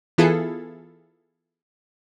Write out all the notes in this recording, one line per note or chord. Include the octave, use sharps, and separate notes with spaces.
E3 B3 E4 F4 G#4 A4